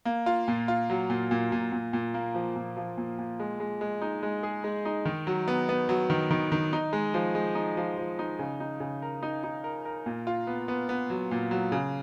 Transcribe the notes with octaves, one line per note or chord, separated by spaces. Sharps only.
A#3
F4
A#2
F4
F#3
A#2
A#2
A#2
A#2
A#2
A#3
F3
A#2
F3
A#2
A#2
G#3
G#3
G#3
D#4
G#3
G#4
G#3
D#4
D#3
F#3
B3
B3
F#3
D#3
D#3
D#3
D#4
G#3
F3
G#3
D#4
F3
F3
D#4
C#3
D#4
C#3
A#4
D#4
D#4
A#4
A#4
A#2
F4
B3
B3
B3
F#3
A#2
F#3
C#3